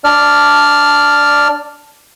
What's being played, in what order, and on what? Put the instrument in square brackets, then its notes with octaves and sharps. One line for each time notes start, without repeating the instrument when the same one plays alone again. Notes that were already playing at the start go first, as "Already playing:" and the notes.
[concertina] D4 D5 F6